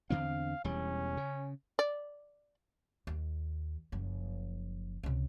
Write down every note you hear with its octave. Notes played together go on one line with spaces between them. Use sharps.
E2 D3 C4 F5
E1 E2 G3 C#4
C#3
D5
D#2
F#1 F3
C#2 C3